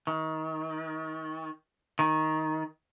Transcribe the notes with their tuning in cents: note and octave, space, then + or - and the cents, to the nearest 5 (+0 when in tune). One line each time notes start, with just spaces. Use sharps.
D#3 +30
D#3 +10